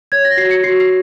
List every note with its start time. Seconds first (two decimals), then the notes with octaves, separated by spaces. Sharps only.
0.12 C#5 G#6
0.25 A#6
0.37 F#4 C7
0.51 C#7
0.64 F#4 C7
0.80 C7